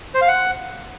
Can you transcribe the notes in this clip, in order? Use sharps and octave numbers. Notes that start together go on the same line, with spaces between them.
C5
F5
F#5